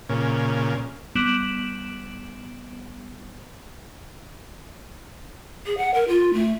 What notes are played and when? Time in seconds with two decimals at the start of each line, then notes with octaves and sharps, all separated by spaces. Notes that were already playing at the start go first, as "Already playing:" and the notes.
0.09 A#2 C#3
1.15 G3 B3 D7 E7 F#7
5.66 G#4
5.77 F#5
5.94 A#4
6.08 F4
6.33 A3